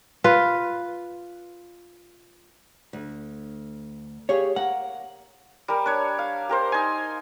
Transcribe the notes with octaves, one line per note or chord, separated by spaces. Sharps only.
F4 B4
D2
G4 G#4 C#5 F5
A#3 F#5
G3 A#4
D4 C#5
F5
G4 A#4 C5
D#4 G#5